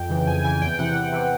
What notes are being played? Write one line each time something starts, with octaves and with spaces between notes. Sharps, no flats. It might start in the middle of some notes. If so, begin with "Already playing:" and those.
Already playing: F2 G5
C#3 E3
F2 G#5
C#3 E3 G#5
E2 G5
C3 E3 F#5
E2
C3 E3